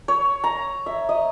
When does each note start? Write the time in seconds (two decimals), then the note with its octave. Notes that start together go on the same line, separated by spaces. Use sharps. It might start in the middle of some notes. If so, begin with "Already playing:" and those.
0.08 C#5
0.44 A#5
0.86 E5
1.09 D#5